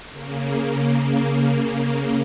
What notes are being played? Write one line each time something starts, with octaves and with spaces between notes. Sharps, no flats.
C#3 A#3